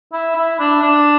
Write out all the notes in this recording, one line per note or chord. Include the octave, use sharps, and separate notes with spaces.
E4
E4
D4
D4